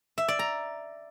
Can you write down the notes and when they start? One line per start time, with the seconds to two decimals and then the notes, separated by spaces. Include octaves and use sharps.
0.18 E5
0.28 D5
0.39 A#5